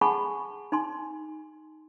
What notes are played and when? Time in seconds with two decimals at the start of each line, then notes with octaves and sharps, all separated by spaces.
0.01 G#4 F#5 G#5 A5 B5 C#6
0.72 D#4 G#5 C6